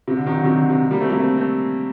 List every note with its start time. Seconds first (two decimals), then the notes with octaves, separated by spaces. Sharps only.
0.08 C3
0.17 D3
0.26 C3 D#3
0.35 D3 F#3
0.44 C3 D#3
0.57 D3
0.70 C3
0.82 D3
0.91 G3 A#3
1.00 A3 C4
1.10 G3 A#3
1.20 A3 C4
1.37 A3 C4